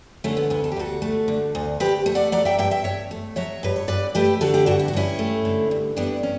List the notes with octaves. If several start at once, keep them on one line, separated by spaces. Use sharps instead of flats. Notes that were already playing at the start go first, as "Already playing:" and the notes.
D3 A3 C#4
B3
D2 B3
A4
G4
D2 F#4 A4
A3
D3
D2
D2 G4 B4
A3
D5 F#5
F#3 D5 F#5
E5 G5
G2 E5 G5
E5 G5
G2 C#5 E5
A3
F#3 C#5 E5
G2 B4
C#5
G2 B4 D5
A3 G4 B4
D3 F#4 A4
E4 G4
G2 D4 F#4
E4
F#4
G2 C#4 E4
A3
D3
G2
G2 B3 D4
C#4